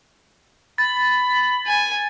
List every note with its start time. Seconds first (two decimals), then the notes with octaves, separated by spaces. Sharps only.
0.78 B5 A6
1.67 G#5